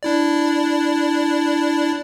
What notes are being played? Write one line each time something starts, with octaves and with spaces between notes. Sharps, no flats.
D4 E4 D5